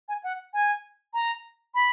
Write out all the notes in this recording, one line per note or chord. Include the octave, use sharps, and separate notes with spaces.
G#5
F#5
G#5
A#5
B5